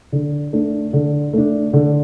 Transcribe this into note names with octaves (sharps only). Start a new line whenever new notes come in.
D3
A3 D4
D3
A3 D4
D3